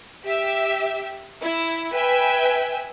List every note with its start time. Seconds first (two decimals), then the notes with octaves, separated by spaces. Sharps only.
0.23 G4 E5
1.40 E4
1.93 B4 E5 G5 G#5